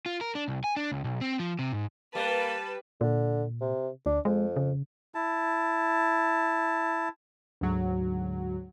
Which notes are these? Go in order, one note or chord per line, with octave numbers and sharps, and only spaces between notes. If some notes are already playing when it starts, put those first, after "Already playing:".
F4
A#4
D4
C2
G#5
D4
C#2
B1
C4
F3
C3
G#2
G3 A#3 B4 A5
A#2 D3
C3
D2 D4
F2 G#3
C#3
E4 A5
D2 G#2 F#3